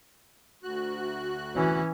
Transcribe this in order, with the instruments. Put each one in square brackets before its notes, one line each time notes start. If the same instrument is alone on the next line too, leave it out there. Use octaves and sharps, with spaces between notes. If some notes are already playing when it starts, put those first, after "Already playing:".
[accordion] D2 F#4 F#6
[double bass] E3 C#4